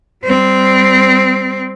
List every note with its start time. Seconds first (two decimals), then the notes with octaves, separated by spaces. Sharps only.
0.24 G3 C4